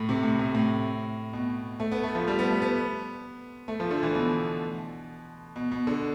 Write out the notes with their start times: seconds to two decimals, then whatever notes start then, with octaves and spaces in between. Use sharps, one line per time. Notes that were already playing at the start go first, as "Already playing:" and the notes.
Already playing: A2
0.09 C3
0.23 A2
0.39 A2
0.55 A2
1.33 B2
1.80 A3
1.92 B3
2.03 A3
2.15 F3
2.28 G3
2.39 B3
2.51 A3
2.62 B3
3.68 A3
3.80 F3
3.91 D3
4.03 E3
4.15 B2
5.56 B2
5.71 B2
5.87 D3